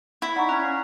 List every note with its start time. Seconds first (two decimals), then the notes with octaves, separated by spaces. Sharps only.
0.22 E4 B6
0.36 D#4 D5 F#5 A#5 C#6
0.49 C#4 A#5 F#6 G#6
0.63 F5